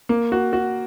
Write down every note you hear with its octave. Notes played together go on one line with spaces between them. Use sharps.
A#3
F#4
F#4